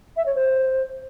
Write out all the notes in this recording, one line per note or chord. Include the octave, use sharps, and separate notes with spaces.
E5
C#5
C5